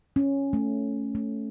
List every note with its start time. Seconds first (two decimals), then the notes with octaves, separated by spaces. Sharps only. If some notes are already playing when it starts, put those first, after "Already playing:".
0.16 C#4
0.53 A3
1.15 A3